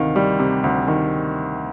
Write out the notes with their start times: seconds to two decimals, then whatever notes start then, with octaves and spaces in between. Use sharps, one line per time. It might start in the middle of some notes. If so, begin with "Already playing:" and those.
Already playing: D2 C3 D#3 F5
0.16 G3
0.39 C3
0.64 D2
0.88 D#3